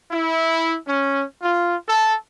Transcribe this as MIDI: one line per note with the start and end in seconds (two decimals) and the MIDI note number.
0.12 0.77 64
0.87 1.23 61
1.42 1.76 65
1.88 2.15 69